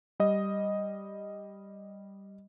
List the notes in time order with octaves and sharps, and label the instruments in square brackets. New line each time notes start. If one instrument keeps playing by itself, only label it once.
[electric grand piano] G3 D#5